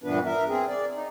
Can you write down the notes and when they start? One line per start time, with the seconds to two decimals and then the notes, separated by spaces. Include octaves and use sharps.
0.04 G2 A#2 E3 B3 D4 B4
0.25 A#4 E5
0.48 C4 G#4
0.68 D5
0.95 D#4